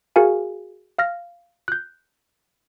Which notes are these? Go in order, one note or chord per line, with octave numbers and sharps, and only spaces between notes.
F#4 G#4 A#4 F5 G#5
F5 F6 A#6
F#6 G6